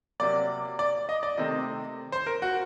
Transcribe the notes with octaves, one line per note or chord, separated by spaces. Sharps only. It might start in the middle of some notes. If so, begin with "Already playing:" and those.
C3 F#3 A#3 D5
D5
D#5
D5
C3 D#3 A3 C4 D#5
C5
A#4
F#4